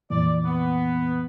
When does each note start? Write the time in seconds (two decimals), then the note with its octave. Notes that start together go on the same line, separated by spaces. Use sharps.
0.10 F2 A#2 E3 D5
0.44 B3